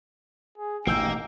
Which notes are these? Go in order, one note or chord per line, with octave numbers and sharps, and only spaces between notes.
G#4
A1 B2 A#3 D#4 G5 E6 G6